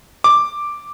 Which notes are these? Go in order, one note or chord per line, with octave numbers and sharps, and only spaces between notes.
D6